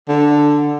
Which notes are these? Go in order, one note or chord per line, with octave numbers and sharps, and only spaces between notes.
D3